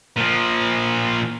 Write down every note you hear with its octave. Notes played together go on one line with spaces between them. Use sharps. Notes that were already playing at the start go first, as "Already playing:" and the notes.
A#2 F3